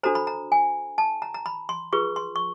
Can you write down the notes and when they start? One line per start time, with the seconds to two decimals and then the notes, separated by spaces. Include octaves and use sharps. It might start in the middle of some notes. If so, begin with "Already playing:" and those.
0.03 D4 F#4 A4 C5 A#5
0.15 B5
0.27 A#5
0.52 G#5
0.98 A5
1.22 A#5
1.34 A#5
1.46 B5
1.69 C6
1.93 F4 G#4 B4 C#6
2.16 C6
2.36 C#6